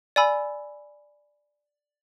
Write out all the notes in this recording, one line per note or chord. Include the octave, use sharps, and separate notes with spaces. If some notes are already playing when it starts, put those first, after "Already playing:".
D5 G#5 B5 E6